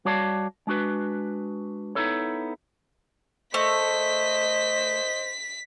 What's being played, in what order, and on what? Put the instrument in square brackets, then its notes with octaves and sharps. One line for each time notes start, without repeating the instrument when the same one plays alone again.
[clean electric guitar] G3 F#4 C#5 D5 F5 A5
G#3 D4 F#4 B4
B3 D#4 E4 A4 C#5
[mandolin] A3 [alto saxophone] C5 [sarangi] D#5 [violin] B6